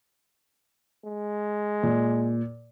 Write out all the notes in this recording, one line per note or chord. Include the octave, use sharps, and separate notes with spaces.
G#3
A#2